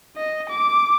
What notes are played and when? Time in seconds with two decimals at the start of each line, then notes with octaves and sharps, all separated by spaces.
0.17 D#5
0.49 D6